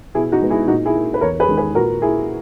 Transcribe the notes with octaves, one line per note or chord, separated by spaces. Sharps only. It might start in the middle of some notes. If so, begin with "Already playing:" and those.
B2 E4 G#4
D#4 F#4
G#3 B3
E4 G#4
A#2 D#4 F#4
E4 G#4
A#3
B4
E2 A#4 C#5
G#4 B4
D#3 G#3
G#4 B4
A#2 F#4 A#4
A#3 E4 G#4